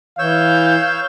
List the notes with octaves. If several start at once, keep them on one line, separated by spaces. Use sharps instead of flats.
E3 C#5 F5 E6 G6